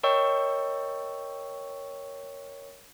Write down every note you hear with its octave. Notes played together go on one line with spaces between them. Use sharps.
A#4 C#5 D#5 G5 C#6 E6